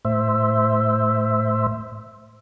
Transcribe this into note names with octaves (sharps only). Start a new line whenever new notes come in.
A2 C5 E5